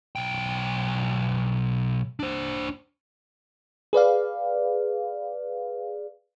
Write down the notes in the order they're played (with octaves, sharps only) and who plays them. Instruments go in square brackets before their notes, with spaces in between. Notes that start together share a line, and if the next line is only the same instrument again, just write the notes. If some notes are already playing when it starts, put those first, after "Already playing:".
[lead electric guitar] B1 G5
D4 C5
[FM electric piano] G#4 B4 D5 F5